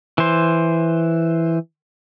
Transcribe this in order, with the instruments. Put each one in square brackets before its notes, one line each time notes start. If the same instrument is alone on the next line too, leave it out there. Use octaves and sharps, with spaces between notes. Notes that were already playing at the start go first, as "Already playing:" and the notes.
[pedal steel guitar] E3 C5